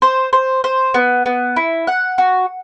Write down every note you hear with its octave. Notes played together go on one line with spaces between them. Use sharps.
C5
C5
C5
B3
B3
E4
F#5
F#4